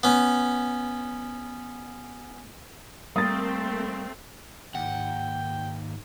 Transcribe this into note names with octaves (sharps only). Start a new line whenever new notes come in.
B3 C#4
G3 A3 A#3 C4 D#6 A6
D#2 G#2 F#5 G5